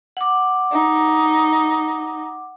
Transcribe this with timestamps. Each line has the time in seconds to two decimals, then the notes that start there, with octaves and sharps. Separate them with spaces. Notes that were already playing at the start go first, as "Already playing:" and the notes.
0.17 F#5 D6
0.72 D#4